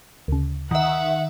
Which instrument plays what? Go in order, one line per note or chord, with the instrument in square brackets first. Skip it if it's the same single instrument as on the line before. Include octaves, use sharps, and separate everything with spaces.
[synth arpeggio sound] D2 C#3
[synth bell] D#3 E5 [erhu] F#5